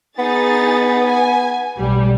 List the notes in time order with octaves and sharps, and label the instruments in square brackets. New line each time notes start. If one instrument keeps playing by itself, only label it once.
[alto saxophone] B3 [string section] D#4 G#4 A6
[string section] G#5
B1 A2 G3